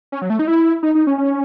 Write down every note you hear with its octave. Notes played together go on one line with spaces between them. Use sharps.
C#4
F#3
A3
D#4
E4
D#4
D#4
C#4
C#4